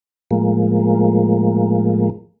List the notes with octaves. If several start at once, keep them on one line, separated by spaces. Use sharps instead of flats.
A2 F3 G#3 A#3